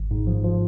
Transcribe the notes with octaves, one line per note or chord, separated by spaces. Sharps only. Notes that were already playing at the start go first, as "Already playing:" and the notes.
Already playing: G#1
G#2
F3
F3